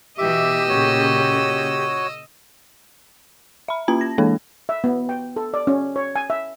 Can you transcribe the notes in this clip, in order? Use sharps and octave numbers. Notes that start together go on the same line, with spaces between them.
B2 E3 G4 D#5 E5 D6 E6
A#2 C#3 F#4 C#5
E5 B5
A#3 C#4 F4 A5 G#6
A#6
E3 G#3 A#3 D4 A4
E5
B3
G5
A4
D5
C#4
C#5
G#5
E5